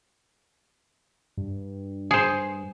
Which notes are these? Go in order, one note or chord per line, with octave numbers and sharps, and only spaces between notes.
G2
G#4 C5